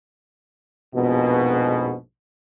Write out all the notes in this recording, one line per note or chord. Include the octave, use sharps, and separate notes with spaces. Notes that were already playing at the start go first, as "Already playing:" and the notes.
A#1 F2 G#2 B2